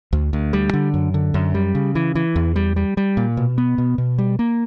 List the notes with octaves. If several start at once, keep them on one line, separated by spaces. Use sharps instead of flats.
D2
D2
G3
D3
F#2
D3
F#2
G3
C#3
E3
E3
E2
G3
G3
G3
A#2
B2
B3
B2
B2
G3
A#3